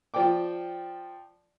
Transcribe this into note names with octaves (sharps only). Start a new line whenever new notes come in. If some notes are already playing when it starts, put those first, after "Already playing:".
F3 D5 G5 D6